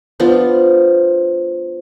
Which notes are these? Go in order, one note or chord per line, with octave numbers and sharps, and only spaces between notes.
F3 B3 D4 F4